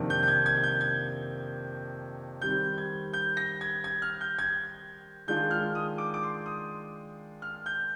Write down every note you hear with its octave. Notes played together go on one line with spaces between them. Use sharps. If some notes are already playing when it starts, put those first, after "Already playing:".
Already playing: F2 C3 D#3 A#3 D4
G6
G6
G#6
G#6
G6
G#6
D#3 G3 C4 G6
G#6
G6
A#6
G#6
G#6
F6
G6
G#6
D#3 G#3 D4 F4 G6
F6
D#6
D6
D6
C6
D#6
F6
G6